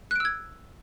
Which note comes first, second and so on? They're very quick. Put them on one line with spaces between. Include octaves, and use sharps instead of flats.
F#6 D7 E6 G#6